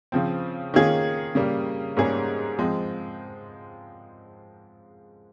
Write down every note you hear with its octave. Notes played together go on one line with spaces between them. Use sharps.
C#3 F3 C4
D#3 A#3 C#4 F4 G#4
C#3 G3 A#3
G#2 G3 A#3 C#4 G#4
F3 G#3 C4